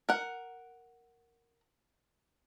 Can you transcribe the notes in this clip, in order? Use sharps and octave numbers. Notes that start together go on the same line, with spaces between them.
A#4 F#5